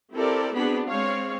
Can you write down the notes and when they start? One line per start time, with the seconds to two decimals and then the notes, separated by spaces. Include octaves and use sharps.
0.14 C4 E4 G4 A4 A#4 D5
0.54 B3 C4 D4 F#4 G#4 B5
0.86 G#3 C4 C#5 F5